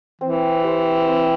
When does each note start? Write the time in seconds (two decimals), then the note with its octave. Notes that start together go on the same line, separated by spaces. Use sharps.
0.21 E3 C4
0.64 G4 C5
1.07 C4